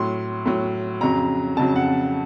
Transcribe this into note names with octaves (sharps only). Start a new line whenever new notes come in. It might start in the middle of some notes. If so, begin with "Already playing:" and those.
Already playing: A2 F#3 C6
A2 F#3
F2 C#3 F#3 A#5
F2 C#3 F#3 A5
F#5